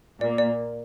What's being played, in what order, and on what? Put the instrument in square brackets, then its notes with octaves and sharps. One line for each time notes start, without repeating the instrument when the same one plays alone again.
[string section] A#2 A#3 [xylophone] D5
[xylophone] D5